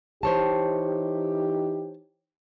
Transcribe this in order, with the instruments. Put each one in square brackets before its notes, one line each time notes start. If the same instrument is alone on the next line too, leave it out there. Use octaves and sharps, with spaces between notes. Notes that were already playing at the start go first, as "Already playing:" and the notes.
[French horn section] E3 D#4 G4 [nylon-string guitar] C5 C#5 A5